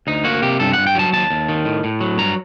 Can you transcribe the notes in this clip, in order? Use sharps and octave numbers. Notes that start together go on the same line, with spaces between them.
D2 D#4
A#3 F#4
C3 G4
G2 A4
G2 F#5
G5
F#3 A5
D#2 A5
D#2
D#3
A2
A2
F#3
G2 A#5